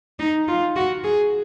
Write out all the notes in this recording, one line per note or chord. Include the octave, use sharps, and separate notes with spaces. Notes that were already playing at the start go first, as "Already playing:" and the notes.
D#4
F4
F#4
G#4